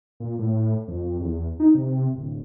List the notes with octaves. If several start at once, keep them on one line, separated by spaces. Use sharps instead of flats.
A#2
A2
F2
E2
D#4
C3
D1